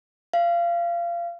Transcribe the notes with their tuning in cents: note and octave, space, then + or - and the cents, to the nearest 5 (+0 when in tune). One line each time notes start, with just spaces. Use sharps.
F5 -25